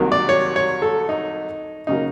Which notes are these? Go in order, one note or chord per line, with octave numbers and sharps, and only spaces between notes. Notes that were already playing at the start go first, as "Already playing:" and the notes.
Already playing: C2 C3 D#3 F#3 A#3
D5
C#5
C#5
A4
D#4
C#3 F#3 A#3 D#4